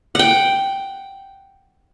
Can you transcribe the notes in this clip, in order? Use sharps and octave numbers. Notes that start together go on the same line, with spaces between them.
F#5 G5